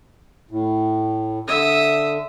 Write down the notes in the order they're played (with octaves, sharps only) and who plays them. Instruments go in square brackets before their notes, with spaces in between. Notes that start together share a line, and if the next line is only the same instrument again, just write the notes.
[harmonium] A2
[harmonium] D3 [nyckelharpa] E5 D#6